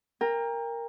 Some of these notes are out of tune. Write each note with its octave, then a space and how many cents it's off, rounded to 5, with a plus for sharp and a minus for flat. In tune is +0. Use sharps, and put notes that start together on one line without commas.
A#4 +0 G5 +35